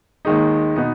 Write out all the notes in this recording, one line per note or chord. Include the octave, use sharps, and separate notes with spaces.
D#2 D#3 G#3 D#4
B2 B3 D#4